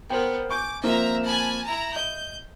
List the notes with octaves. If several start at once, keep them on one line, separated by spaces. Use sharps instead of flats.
B3 A#4 C5 G5
G#5 C#6 D6 G6
F3 A#3 C4 E5 A#5
G#5 A5 B5
E4 A#5
D#5 G6